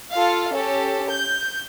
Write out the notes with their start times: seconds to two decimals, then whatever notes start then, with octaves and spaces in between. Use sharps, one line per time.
0.13 F4 A4 F5
0.55 C#4 G4 A4
1.09 G6